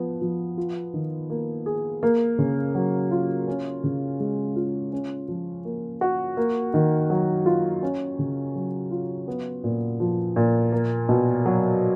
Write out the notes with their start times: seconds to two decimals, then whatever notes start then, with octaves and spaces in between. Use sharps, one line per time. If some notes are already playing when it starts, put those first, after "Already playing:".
Already playing: F3 B3
0.21 F3
0.57 F4
0.94 D#3
1.30 A#3
1.66 G#4
2.03 A#3
2.38 C#3
2.75 F#3
3.11 F4
3.48 C#4
3.84 C#3
4.20 G#3
4.56 F4
4.92 C#4
5.28 F3
5.65 A#3
6.01 F#4
6.37 A#3
6.74 D#3
7.10 F#3
7.46 F4
7.83 C#4
8.19 C#3
8.55 F#3
8.91 F4
9.28 B3
9.64 A#2
10.00 F3
10.36 A#2
10.72 A#3
11.09 B2
11.46 F#3